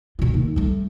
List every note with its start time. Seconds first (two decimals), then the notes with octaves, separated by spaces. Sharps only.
0.19 B2 F4
0.34 D#2
0.56 G3 A3